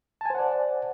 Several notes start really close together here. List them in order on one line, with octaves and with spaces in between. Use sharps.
A5 G#5 C5 F#5 D5